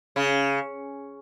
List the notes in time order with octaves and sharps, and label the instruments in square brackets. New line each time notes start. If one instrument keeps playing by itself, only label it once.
[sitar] C#3